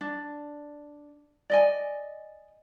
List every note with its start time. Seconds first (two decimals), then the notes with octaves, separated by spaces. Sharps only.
0.01 D4
1.50 D5 D#5 G#5